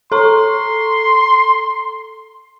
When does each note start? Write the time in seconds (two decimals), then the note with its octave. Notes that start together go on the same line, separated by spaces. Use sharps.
0.12 A4 A#5 C6 C#6